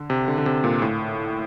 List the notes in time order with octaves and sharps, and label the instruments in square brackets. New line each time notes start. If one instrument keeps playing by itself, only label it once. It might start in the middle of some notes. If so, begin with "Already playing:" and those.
Already playing: [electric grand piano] D3
C3
D3
D3
C3
A#2
A2